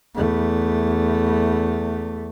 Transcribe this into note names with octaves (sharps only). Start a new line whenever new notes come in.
E2 A3